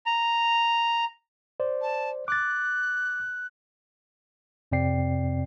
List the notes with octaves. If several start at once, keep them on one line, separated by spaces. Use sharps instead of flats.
A#5
C5 D5
A5
D6 F#6 A6
F2 C3 C4 D5 G5 C7